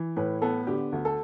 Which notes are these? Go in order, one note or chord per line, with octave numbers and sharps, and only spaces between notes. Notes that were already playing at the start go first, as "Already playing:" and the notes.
Already playing: E3
A2 B4
B3 A4
D3 G4
D2
A4